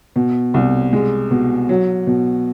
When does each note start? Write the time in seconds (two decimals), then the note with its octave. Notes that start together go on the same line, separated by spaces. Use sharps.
0.16 B2
0.54 C2
0.93 G#3
1.31 B2
1.69 F#3
2.07 B2